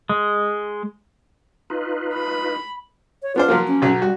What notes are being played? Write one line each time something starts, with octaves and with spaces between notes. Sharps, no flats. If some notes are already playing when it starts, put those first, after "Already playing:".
G#3
D#4 F4 B4
B5
C#5
B3 D4 F4 C5
F3 F#3 A#3
C#4
B1 F#3
G3 F#4